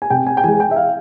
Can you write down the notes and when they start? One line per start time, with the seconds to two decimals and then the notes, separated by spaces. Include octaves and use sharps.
0.02 G#5
0.10 C3 G5
0.27 G#5
0.37 G5
0.44 E3 G#3 G#5
0.60 G5
0.71 E5
0.76 F5